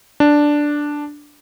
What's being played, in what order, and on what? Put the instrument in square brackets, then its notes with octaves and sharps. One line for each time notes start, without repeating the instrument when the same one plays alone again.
[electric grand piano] D4